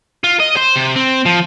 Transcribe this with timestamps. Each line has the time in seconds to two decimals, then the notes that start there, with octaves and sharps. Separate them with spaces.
0.24 F4
0.40 D#5
0.57 C5
0.76 C3
0.96 C4
1.26 F3